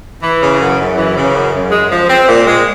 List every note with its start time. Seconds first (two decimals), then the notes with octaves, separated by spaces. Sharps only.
0.23 E3
0.42 C#3
0.60 F#2
0.79 F#2
0.98 E3
1.16 C#3
1.35 F#2
1.53 F#2
1.71 G#3
1.91 F3
2.09 C4
2.28 A#2
2.46 G#3